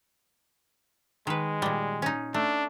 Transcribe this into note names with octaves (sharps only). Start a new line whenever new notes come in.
D#3 G#3 B4
A#2 G3
C#4 D#4
A3 D4